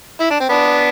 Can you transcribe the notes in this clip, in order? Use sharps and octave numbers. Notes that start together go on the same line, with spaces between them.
E4
D4
C4
B3 D4